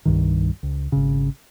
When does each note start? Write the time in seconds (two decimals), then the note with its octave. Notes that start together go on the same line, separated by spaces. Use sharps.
0.05 C2 G2 D#3
0.63 C#2
0.92 G#1 C#3